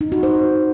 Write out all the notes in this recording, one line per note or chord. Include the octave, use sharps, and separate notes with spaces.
D#4
F#4
C5